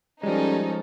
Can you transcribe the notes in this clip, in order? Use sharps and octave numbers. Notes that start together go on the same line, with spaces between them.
F3 G3 G#3 C#4 D#4 A4